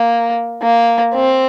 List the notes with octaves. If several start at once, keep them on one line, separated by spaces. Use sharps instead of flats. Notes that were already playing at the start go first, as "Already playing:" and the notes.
Already playing: A#3
A#3
C4